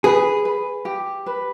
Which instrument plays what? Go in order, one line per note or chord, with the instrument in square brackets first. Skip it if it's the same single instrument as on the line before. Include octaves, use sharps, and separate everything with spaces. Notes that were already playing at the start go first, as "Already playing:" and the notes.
[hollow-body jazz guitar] G#4 [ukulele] B4
[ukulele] B4
G4
B4